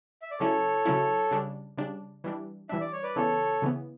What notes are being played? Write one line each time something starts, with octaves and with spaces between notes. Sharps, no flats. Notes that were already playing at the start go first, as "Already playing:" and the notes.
E5
D5
C#3 F#3 C#4 E4 A4 C#5
C#3 F#3 C#4 E4
C#3 G3 D4
C#3 G3 D4
E3 G3 D4
E3 G3 D4 E5
D5
C#5
B4 D5
C#3 E3 B3 A4 C#5
C#3 E3 B3